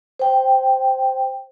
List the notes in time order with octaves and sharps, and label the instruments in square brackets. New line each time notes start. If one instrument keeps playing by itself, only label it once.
[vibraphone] C5 G5